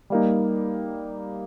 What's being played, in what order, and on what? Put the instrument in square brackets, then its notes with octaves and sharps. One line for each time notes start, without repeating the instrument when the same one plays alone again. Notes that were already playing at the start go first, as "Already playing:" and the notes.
[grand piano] G3 A#3 D#4